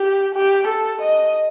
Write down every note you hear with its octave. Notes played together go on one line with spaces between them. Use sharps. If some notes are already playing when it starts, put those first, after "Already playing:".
Already playing: G4
G4
A4
D#5